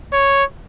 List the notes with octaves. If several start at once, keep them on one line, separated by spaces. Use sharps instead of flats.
C#5